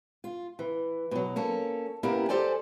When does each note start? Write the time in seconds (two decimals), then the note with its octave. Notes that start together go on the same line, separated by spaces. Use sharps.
0.24 F4
0.59 E3
1.11 B2 F#3
1.36 A#3 C#4 A4
2.03 A#3 B3 C#4 E4 G4 A#4
2.29 G4 A4 C5 D5 G#5